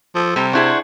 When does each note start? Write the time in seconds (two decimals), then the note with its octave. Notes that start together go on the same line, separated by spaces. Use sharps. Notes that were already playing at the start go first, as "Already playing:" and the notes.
0.15 F3 A4
0.36 C3 G3
0.53 D4 E4 G#4 C5 F#5 C#6